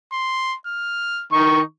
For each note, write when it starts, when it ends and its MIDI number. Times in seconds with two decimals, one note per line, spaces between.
0.12 0.56 84
0.66 1.25 89
1.32 1.60 51
1.32 1.64 63
1.32 1.60 85